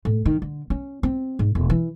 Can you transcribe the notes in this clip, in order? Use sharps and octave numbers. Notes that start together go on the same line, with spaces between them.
A2
D#3
D3
C#4
C4
G#2
E1
E3